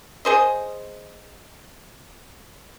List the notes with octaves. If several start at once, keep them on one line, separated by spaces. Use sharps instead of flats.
G#4 C5 D#5